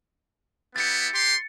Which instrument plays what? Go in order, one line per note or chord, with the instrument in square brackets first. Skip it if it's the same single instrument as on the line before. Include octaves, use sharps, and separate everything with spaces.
[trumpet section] B3 E4 G4 [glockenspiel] A6 C#7
[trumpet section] G4 C6